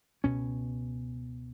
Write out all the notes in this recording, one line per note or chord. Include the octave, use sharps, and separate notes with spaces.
C#2 B2 C#4